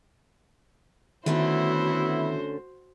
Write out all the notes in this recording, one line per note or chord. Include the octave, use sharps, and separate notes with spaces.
D3 D#3 A3 B3 C#4 E4 F#4 C5